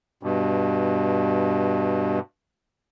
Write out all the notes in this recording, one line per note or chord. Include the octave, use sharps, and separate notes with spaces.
G2 B2